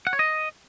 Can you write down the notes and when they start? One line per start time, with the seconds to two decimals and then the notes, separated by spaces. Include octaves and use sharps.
0.07 F#5
0.13 C#5
0.19 D#5